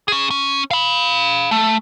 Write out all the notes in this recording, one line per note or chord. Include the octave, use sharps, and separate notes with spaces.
C#4 G#4
C#4
F5 B5
A3